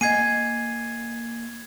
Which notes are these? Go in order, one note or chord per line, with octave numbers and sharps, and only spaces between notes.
A#3 D#5 F#5 G#5 G#6 C7 D#7